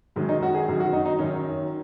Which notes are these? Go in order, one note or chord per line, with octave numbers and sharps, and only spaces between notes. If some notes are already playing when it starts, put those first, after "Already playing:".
F#2 D#3 G#3
D#4
F#4
G#4
F#2 D#3
F#4
D#4
D#4
F#2 D#3 C#4